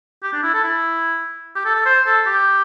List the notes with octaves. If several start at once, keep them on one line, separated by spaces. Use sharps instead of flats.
G4
D4
E4
A4
E4
G4
A4
A4
C5
A4
G4